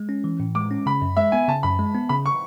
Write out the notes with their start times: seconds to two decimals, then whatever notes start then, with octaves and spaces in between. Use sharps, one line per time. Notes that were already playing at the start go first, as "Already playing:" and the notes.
Already playing: G#3
0.09 C#4
0.24 E3
0.40 A2
0.55 G#3 D6
0.71 C#4
0.86 C#3 B5
1.02 F#2
1.17 G#3 E5
1.32 B3 G#5
1.48 C#3 A5
1.63 F#2 B5
1.79 G#3
1.94 B3
2.09 C#3 B5
2.26 C#6